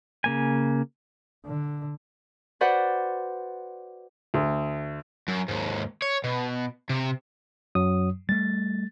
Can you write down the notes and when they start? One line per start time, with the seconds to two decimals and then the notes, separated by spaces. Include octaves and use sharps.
0.24 C#3 A#3 G#5
1.46 D3
2.61 F#4 B4 C5 D5 F#5
4.34 D2
5.28 F#2
5.48 D#2 G#2
6.02 C#5
6.24 B2
6.89 C3
7.75 F#2 F#3 D#6
8.29 G3 A3 A6